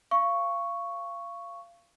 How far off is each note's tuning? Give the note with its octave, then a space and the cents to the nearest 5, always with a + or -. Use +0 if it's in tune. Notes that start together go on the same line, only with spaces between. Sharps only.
F5 -25 C#6 +0